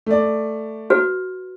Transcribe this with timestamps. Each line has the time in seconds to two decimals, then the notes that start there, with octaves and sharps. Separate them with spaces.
0.06 A3 D5
0.90 F#4 B4